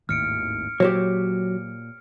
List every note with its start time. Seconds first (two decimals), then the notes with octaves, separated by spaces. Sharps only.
0.09 G#1 D#2 A2 F6 C#7 D7
0.80 A#2 F#3 G4 C5 C#5